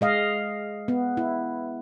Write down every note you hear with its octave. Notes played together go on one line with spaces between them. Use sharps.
G#3 D#5 F5
B3
E4